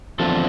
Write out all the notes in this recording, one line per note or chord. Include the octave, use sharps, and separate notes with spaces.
E2 D3 F3 C4 A4